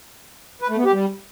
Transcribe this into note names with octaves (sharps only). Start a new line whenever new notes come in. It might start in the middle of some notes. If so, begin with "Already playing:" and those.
B4
A3
B3
G4
G3